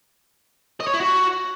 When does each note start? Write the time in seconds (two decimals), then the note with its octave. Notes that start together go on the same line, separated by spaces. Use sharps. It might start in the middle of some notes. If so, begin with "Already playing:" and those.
0.80 D#5
0.87 C#5
0.94 E4
1.00 F#4